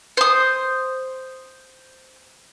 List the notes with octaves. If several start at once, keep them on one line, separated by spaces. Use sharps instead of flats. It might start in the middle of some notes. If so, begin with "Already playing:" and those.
C5 D#6